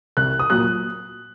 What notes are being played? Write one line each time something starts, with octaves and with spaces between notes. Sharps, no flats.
C2 F#6
D#6
A#2 F#3 F#6